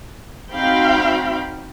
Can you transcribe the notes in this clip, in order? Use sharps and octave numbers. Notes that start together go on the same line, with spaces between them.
C4 D#4 F#4 F5 G5 B5